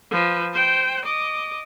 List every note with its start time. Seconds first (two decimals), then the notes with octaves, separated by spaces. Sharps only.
0.11 F3 B4
0.53 C5 G5
1.05 D#5 D6